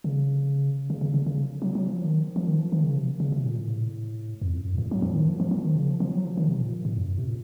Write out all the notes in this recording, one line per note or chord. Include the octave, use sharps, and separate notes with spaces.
C#3
C#3
C#3
C#3
C#3
F#3
F#3
F3
D#3
F3
D#3
F3
D#3
C#3
C3
C#3
C3
A#2
A2
F2
F#2
A#2
A2
F#3
F3
D#3
F3
F3
F3
D#3
C#3
F3
F3
F#3
F3
D#3
C3
A#2
A2
F#2
C3
A#2